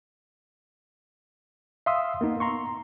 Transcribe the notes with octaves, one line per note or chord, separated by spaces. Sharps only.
E5 F5 C6 D#6 E6
A#3 B3 D#4
A#5 C6 C#6